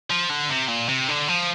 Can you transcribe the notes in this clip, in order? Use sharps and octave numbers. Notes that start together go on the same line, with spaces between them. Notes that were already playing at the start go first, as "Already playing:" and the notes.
F3
D3
C3
A#2
C3
D3
F3